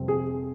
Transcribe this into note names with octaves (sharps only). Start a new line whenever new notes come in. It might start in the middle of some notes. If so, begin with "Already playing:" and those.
Already playing: F1 F2 C3 G3 C4
G#4